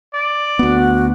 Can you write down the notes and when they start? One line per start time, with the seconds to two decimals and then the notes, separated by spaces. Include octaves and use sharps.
0.14 D5
0.59 D2 B3 F#4